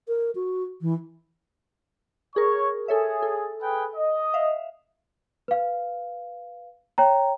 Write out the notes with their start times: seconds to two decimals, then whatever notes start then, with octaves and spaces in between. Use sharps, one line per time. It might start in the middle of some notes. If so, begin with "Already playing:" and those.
0.08 A#4
0.35 F#4
0.81 E3
2.36 G#4 A#4 C#5 C#6
2.88 G#4 A4 C#5 E5
3.22 A4
3.62 G#4 B4 G5
3.96 D#5
4.34 E5 F5
5.48 B4 F5
6.98 C#5 G5 A#5